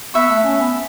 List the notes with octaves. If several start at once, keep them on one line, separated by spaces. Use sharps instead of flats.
B3 B4 E5 C#6
A3
C#4
B3